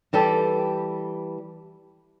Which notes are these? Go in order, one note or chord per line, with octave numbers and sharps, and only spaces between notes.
E3 G3 G4 A4